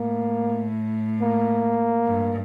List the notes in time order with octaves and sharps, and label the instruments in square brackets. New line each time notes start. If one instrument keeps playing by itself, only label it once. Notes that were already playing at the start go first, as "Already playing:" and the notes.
Already playing: [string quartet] A2 [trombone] A#3
[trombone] A#3
[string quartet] G2